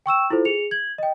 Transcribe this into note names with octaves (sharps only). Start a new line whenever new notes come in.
G5 C#6 E6 E7
E4 F4 A4 C5
G#4 C#7 F7
G#6 F#7
D#5 G5